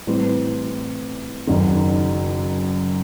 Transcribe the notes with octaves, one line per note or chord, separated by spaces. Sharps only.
A2 E3 G3 C4
F#1 F#2 D#3